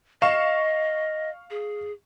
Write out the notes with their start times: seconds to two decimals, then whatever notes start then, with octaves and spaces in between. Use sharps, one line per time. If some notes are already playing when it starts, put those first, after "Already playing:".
0.22 D#5 F5 C#6 E7
1.51 G#4